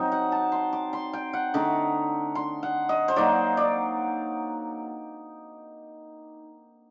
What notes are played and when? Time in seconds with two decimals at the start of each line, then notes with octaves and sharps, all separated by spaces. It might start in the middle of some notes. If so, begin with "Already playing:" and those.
Already playing: F#3 C4 D#4
0.12 F#5
0.32 A5
0.52 C6
0.73 D6
0.93 C6
1.13 G5
1.33 F#5
1.54 D3 A3 D#4 D6
2.35 C6
2.63 F#5
2.89 D#5
3.08 C5
3.16 F#3 A#3 D#4 D5
3.57 D5